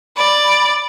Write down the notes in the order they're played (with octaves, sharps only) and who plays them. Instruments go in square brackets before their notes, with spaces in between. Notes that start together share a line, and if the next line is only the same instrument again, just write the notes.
[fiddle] D5 [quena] B5